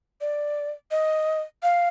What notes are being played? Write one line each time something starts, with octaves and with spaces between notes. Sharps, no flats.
D5
D#5
F5